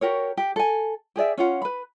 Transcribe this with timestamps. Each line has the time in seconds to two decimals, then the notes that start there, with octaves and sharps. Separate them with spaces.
0.01 F#4 G4 A#4 C#5
0.37 G4
0.56 A4 G#5
1.16 G4 G#4 D5 E5
1.38 C#4 F4 F#5
1.62 B4 B5